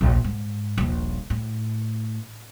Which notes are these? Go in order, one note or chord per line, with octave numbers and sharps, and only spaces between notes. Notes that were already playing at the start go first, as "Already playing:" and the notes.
A#1 D#2
G#2
D#1 A#1
A2